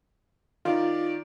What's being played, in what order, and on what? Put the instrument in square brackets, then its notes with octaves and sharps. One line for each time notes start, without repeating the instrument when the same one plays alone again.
[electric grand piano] D#3 [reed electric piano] F4 [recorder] D5